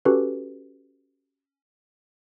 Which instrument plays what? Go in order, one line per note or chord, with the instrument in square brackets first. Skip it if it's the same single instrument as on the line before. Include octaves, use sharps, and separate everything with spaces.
[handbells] C#4 F#4 G4 A4 B4